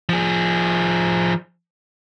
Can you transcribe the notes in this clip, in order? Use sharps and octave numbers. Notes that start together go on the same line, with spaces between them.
F3 G#4